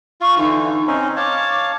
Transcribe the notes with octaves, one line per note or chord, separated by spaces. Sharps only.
F4 C#6
D3 E3 D#4
C4 C#4 D#4
C#5 F5 A5 D6